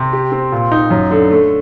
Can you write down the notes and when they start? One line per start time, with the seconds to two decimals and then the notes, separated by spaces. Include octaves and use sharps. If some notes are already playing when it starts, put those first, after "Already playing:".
Already playing: C3
0.13 G4
0.32 C4
0.52 A#2
0.72 D#4
0.90 F#2
1.11 D3
1.31 A3